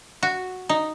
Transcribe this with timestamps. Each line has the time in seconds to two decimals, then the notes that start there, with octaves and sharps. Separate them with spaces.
0.23 F#4
0.69 D#4